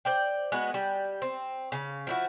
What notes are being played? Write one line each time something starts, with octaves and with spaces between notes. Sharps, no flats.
C5 D5 G5
G#3 B3 F#4
G3
C4
C#3 F5
F3 E4 F#4